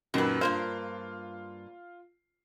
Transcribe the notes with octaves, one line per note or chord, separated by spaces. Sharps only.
F#2 A#2 D#3 F#3 B4
G2 A#3 F4 C5